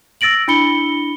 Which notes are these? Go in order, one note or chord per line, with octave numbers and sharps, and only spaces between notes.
E6 A6 A#6 D7 F#7
D4 E4 B5 C#7 G7